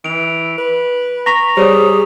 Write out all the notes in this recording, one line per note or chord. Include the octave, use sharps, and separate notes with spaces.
E3 D7 F7
B4
A#5 C#6 A#6 B6 F7
G3 G#4 C5 C#5